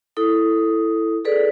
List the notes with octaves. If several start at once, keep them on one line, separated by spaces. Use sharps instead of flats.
E4 A4 D#6
G#4 A4 B4 D5